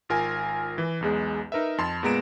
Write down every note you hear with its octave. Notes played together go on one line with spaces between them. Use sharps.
G#1 F4 A#4 G#5
E3
B1 E2 G#3
D#4 A#4 B4 E5
F2 A5 C6
A#2 G#3 B3 A#5 D7 E7